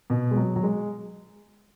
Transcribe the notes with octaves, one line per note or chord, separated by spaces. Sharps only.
B2
G#3
F#3
F#3
G#3